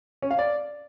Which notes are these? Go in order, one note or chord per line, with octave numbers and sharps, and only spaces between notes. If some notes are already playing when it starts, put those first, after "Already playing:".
C#4
F5
D5